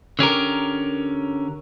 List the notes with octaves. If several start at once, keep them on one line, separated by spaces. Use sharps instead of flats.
D3 C#4 G4 A#4